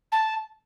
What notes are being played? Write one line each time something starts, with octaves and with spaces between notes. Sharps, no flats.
A5